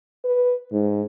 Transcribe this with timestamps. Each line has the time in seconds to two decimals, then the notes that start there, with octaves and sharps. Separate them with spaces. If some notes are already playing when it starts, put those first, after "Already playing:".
0.25 B4
0.72 G#2